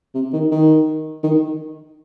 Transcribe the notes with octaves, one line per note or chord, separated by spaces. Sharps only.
C3
D#3
D#3
D#3